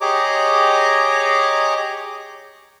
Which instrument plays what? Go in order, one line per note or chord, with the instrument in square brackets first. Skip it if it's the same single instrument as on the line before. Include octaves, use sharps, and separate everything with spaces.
[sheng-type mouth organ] G4 G#4 C#5 D#5 A#5 D6